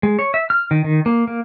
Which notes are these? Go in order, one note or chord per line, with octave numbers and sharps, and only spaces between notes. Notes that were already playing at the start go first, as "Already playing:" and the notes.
G#3
C#5
E5
F6
D#3
D#3
A#3
A#3